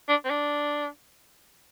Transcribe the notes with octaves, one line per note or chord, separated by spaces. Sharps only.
D4
C4
D4